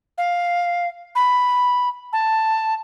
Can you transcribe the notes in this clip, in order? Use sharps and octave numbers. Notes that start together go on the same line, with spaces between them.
F5
B5
A5